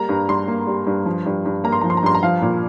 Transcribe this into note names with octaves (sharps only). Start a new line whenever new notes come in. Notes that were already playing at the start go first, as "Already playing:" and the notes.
Already playing: G3 A#3 A#5
G2
G2 C6
A#3
G3
G2
F3
G2
G2
A#3 A#5
C6
F3 A#5
C6
A#5
G2 C6
A#5
F3 F5
A#2